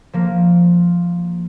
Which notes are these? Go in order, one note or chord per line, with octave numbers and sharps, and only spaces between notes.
F3 A#3